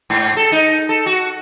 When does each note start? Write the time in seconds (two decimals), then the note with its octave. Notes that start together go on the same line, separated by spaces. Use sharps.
0.10 G#2
0.37 A4
0.52 D#4
0.89 A4
1.06 F#4